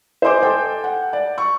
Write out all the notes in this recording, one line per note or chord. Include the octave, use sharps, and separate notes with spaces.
C5 D#5 G#5 C6 D6 G6
A4 G5 G#5
F#5
D5
C#6